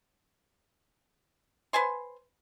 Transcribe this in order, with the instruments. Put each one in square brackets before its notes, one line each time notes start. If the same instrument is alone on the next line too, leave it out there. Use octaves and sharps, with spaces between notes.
[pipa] B4 C5 G#5 C6